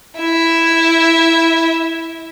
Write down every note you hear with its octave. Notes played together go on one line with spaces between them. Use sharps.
E4 E5